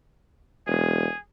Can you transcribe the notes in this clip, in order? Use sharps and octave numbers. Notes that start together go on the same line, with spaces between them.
E1 G#4